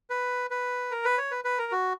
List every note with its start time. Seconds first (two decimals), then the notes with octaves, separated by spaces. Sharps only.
0.10 B4
0.50 B4
0.91 A#4
1.05 B4
1.18 C#5
1.31 B4
1.45 B4
1.58 A#4
1.72 F#4